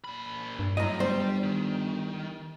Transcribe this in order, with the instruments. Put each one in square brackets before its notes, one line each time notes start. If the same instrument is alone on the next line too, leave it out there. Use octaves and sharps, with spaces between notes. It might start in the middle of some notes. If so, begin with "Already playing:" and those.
[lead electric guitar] A#2 B5
[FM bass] G2
[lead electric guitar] F#2 [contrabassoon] A2 [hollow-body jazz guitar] D#5 A#5
[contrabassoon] G1 [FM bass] G3 [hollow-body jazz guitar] C5 [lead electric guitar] D5 G5
[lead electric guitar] D#3